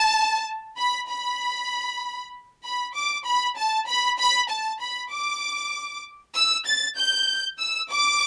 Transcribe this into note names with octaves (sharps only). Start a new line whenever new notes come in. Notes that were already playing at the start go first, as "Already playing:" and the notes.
Already playing: A5
B5
B5
B5
D6
B5
A5
B5
B5
A5
B5
D6
E6
A6
G6
E6
D6